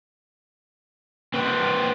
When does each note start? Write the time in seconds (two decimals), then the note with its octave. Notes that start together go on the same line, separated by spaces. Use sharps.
1.34 C4 B4